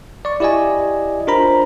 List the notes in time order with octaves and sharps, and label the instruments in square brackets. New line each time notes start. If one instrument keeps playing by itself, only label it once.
[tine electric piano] D5 C#6
E4 G4 D5 D#5 G#5
D4 F4 A#4 C5 A#5 B5